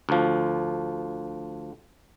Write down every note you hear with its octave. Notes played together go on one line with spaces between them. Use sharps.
D2 F3